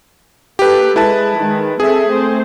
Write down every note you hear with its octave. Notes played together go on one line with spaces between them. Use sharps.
A#3 G4 A4 B4
G#3 E4 B4 A5
D#3 G#3
C4 G#4 A4 E5
A3 C4 C5